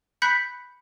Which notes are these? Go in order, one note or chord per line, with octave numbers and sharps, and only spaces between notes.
B5 F#6 G6 B6 C#7